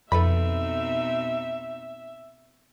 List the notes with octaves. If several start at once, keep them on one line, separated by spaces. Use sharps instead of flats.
F2 B2 C4 D#4 A4 B4 E5 B5